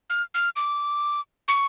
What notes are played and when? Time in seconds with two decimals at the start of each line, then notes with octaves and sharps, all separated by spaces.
0.10 F6
0.34 F6
0.56 D6
1.48 C#6